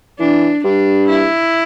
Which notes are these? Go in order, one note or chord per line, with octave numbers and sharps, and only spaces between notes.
E3 D4
G2 D4
E4